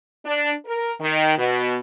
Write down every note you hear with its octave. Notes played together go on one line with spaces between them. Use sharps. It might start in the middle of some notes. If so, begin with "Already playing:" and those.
D4
A#4
D#3
B2